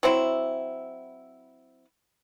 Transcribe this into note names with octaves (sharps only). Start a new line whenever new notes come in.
F#3 C4 E4